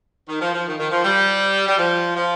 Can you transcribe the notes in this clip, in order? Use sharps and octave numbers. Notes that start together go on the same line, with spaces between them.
D#3
F3
F3
D#3
D#3
F3
G3
G3
F3
F3